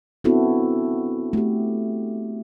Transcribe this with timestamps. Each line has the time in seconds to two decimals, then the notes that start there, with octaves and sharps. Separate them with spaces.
0.24 B3 C4 D4 E4 F#4 A4
1.33 A3 G4